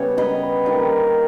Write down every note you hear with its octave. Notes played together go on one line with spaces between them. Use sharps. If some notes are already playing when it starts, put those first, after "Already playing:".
Already playing: C#3 G3 B3 C#5
B4 D#5
D#3 G3 A#3